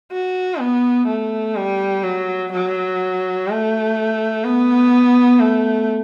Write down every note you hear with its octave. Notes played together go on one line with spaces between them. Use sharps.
F#4
B3
A3
G3
F#3
F#3
A3
B3
A3